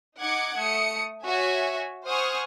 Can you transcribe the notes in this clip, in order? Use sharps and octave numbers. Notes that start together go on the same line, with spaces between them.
D#4 F#5 D6 G#6 C#7
A3 D#6 C#7
F#4 C#5 E5 G#5
C5 F#5 G#5 C#6 D#6 F6